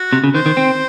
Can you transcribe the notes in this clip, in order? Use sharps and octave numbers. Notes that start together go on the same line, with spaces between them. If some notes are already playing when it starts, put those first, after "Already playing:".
Already playing: F#4
C3
C#3
D#3 C5
D#3
C4